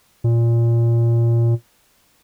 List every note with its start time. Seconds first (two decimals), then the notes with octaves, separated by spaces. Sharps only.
0.24 A#2